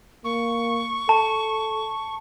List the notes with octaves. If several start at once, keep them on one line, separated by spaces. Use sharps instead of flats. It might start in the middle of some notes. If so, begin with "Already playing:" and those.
A#3 C#6
A4 A5